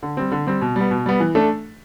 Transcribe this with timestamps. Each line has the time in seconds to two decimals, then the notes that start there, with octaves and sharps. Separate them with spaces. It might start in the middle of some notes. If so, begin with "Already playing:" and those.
0.03 D3
0.17 G3 C4
0.32 D3
0.47 G3 C4
0.62 B2
0.76 G3 B3
0.91 B2
1.06 G3 B3
1.20 E3
1.35 A3 D4 A4